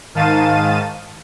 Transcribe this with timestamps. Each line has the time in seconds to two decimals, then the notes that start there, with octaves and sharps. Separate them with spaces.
0.14 G#2 D#3 F5 A5 A6 D#7